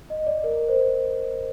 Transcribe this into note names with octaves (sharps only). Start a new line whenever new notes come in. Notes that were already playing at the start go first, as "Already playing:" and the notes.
D#5
D5
A#4
C5